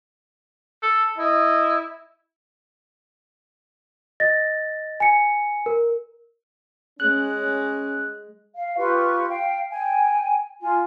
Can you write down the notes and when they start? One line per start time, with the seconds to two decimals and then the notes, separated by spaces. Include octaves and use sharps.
0.83 A4
1.18 E4 D#5
4.20 D#5 A6 A#6
5.00 G#5 C#7
5.66 A#4
7.00 G#3 C#4 F#6
8.54 F5
8.77 F4 G4 B4 C#6
9.27 F5 G5
9.69 G5 G#5
10.61 F4 G#5